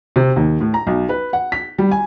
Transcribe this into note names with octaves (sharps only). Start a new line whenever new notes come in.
C3
D#2
A2
A#5
B1
B4
F#5
B6
G3
G#5